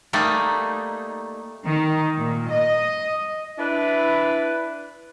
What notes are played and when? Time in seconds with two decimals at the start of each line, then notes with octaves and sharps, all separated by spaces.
0.13 G3 A3 A#3 D#4
1.66 D#3
2.19 A#2
2.50 D#5
3.59 D4 E4 B4